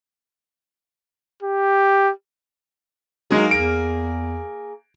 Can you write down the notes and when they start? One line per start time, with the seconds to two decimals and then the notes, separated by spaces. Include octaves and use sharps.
1.43 G4
3.31 F#3 G#3 A#3 D#4 G#4
3.51 E2 D7